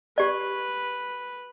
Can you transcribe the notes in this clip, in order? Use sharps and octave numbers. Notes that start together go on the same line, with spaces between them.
G4 B4 D5